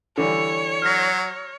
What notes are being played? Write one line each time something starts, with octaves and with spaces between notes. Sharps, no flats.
D3 E3 G3 C#5
F#3 F6 A#6